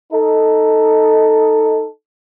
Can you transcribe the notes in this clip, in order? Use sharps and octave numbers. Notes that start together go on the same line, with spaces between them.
D#4 A4